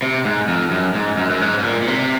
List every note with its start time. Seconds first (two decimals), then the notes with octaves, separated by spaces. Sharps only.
0.02 C3
0.25 G#2
0.48 F2
0.71 F#2
0.95 G#2
1.18 F#2
1.30 F#2
1.41 G#2
1.59 G#2
1.64 A#2
1.82 A#2
1.87 C3